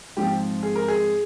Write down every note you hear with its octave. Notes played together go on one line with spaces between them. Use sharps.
G#2 F3 C4 G4
G#4
A#4
G#4